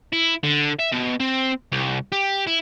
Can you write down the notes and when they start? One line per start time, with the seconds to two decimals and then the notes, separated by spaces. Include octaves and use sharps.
0.13 E4
0.43 D3
0.79 E5
0.92 B2
1.20 C4
1.72 C2
2.12 G4
2.47 E4